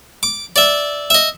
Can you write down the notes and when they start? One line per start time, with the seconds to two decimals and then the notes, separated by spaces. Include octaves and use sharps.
0.23 D6
0.56 D5 E5
1.10 D#5 E5